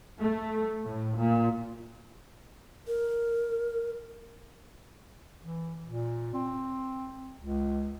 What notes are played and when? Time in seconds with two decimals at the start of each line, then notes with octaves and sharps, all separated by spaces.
0.20 A3
0.85 A2
1.18 A#2
2.88 A#4
5.42 E3
5.85 A#2
6.34 C4
7.39 C#2